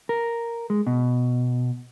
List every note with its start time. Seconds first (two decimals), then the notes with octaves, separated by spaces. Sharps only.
0.09 A#4
0.70 G#3
0.87 B2